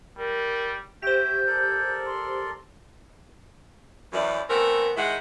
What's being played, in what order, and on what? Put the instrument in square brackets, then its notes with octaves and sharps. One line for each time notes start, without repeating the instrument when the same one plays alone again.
[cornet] G3 [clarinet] A#4
[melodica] F#4 E5 [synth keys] G4 C5 [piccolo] G6
[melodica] A4 A#4 D5
[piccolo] C6
[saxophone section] F#2 E3 D5
E3 A3 B3 C4 A#4
D#3 G#3 D#4 E4 G#4 F#5